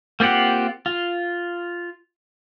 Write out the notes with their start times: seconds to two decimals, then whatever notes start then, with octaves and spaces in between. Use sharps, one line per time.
0.20 A#3 C4 F4 G4 F#5
0.86 F4